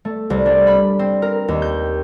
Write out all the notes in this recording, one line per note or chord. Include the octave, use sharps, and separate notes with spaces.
A3
C2
D4
B5
C4
A#4
D#2
G6